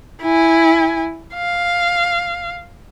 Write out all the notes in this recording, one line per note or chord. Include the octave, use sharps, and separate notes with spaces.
E4 G#5
F5